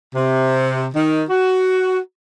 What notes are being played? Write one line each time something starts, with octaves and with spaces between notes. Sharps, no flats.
C3
D#3
F#4